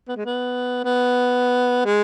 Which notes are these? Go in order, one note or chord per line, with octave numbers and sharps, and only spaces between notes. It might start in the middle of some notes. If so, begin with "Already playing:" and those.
B3
G#3
B3
B3
G#3